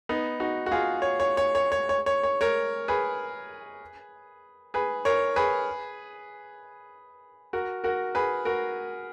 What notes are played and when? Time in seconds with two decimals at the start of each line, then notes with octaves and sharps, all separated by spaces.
0.09 B3 D#4
0.40 D#4 F#4
0.66 F#4
0.72 F4 G#4
1.02 C#5
1.20 C#5
1.37 C#5
1.55 C#5
1.72 C#5
1.89 C#5
2.06 C#5
2.23 C#5
2.41 A#4 C#5
2.88 G#4 B4
4.74 G#4 B4
5.05 A#4 C#5
5.36 G#4 B4
7.53 F#4 A#4
7.84 F#4 A#4
8.15 G#4 B4
8.45 F#4 A#4